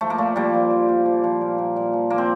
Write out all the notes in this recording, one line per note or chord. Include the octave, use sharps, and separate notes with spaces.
F3 A3
A#3
A#2 A3
F3 G3 A#3
F3
F3
A#2
F3
F3
A#2
A#2
A#2
F3
F3 A#3
C4